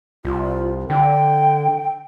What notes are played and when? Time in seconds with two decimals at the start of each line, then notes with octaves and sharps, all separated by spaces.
0.25 C2 F4
0.90 D3 G5